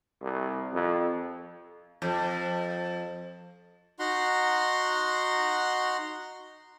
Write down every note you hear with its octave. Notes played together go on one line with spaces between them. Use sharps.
C2
F2
F2
D#4 F#4 F#5 A#5 C6